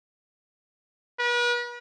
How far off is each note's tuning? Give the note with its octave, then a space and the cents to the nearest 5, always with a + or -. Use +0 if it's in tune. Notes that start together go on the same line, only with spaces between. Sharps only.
B4 -40